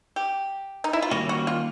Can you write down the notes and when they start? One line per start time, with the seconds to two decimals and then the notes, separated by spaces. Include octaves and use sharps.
0.16 G4
0.84 D#4
0.93 E4
1.02 F4
1.11 D#3 G3 A#3 C#4 F#4
1.29 F#4
1.47 F4